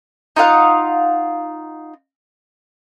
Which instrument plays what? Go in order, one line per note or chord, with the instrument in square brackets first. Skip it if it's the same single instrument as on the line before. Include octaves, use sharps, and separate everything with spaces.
[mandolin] D#4 F4 F5 F#5